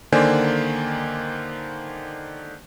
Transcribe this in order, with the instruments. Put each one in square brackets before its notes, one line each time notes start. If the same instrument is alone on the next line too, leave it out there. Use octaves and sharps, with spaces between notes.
[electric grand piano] D3 D#3 A#3 C5 D5 G#5